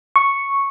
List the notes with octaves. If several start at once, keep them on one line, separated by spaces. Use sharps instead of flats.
C#6